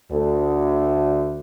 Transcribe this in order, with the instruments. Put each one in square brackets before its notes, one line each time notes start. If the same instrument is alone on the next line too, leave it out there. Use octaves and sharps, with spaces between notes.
[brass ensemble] D2